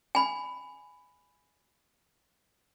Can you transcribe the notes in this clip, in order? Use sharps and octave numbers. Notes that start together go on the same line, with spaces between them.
G#5 B5